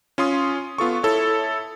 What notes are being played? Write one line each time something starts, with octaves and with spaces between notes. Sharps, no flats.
C#4 F4 C6 D#6
B3 F4 A4 C#6
E4 A4 C#5